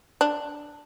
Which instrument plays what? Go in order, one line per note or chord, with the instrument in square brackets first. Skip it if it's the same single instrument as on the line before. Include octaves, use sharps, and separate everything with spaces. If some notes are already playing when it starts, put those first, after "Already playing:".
[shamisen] D4